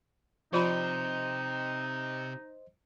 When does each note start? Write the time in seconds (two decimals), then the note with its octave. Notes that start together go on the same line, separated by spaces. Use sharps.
0.53 C3 F3 D#4 F4 C5 D#5 B5